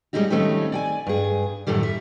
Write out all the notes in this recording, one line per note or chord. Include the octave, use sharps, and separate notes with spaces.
G3 G#3 C4 C#4 D#4 F#4
D#3 F3 G3 A3 C4 C#4
D5 G5 G#5
G2 G#4
F#2 A2 D3 D#3 G3
E5